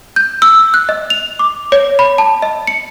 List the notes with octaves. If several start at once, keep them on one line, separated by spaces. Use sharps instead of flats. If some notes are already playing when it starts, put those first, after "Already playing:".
G6
E6
F#6
D#5
F7
D6
C#5
B5
A5
D#5
C#7